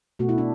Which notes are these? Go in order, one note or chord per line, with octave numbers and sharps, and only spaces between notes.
B2 A3 F#4
E4
D4